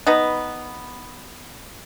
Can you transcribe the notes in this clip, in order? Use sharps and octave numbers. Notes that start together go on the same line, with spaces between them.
B3 D#4 B4 A#5